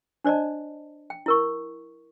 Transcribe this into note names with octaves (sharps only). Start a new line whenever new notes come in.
D4 C5 D5 D#5 A5
G5
E4 A#4 C#6